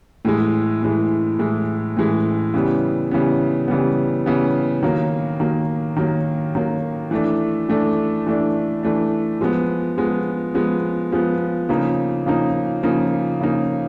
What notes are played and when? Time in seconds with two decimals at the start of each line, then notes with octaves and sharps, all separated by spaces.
0.25 A2 E3 G#3
0.83 A2 E3 G#3
1.39 A2 E3 G#3
1.97 A2 E3 G#3
2.54 C#3 E3 G3 B3
3.11 C#3 E3 G3 B3
3.68 C#3 E3 G3 B3
4.26 C#3 E3 G3 B3
4.83 D#3 F#3 A#3
5.40 D#3 F#3 A#3
5.96 D#3 F#3 A#3
6.55 D#3 F#3 A#3
7.11 E3 A3 D4
7.69 E3 A3 D4
8.26 E3 A3 D4
8.83 E3 A3 D4
9.41 F3 G#3 B3
9.98 F3 G#3 B3
10.54 F3 G#3 B3
11.12 F3 G#3 B3
11.69 C#3 F3 A#3 D#4
12.26 C#3 F3 A#3 D#4
12.83 C#3 F3 A#3 D#4
13.40 C#3 F3 A#3 D#4